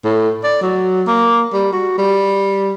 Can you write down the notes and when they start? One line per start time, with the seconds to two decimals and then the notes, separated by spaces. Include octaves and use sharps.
0.04 A2
0.44 D5
0.62 F#3
1.07 A#3
1.53 G3
1.73 F#4
1.98 G3